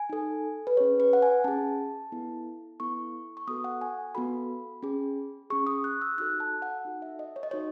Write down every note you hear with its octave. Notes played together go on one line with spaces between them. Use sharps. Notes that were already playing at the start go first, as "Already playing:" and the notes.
Already playing: G#5
D#4 A4
B4
C#4 G#4 C#5
B4
F#5
G#5
C#4 G#4 A5
B3 E4 A4
B3 E4 A4 C#6
C#6
B3 F#4 A4 D#6
F#5
G#5
B3 F#4 A4 B5
C#4 G#4
C#4 G#4 C#6
D#6
F#6
E6
D#4 F#4 A4 F#6
A5
F#5
D#4 F#4 A4
E5
D#5
C#5
D#5
D#4 F#4 A4 C#5